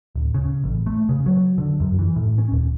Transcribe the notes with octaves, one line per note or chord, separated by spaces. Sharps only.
D1
C#3
A1
A3
C#3
F#3
D3
F#2
E3
A2
C#4
D#1